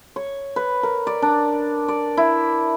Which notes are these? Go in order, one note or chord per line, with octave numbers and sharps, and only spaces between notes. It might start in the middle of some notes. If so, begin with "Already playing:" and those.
C#5
B4
A#4
D5
D4
D5
E4